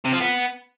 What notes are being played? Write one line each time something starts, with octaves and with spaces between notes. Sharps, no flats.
C3
F3
B3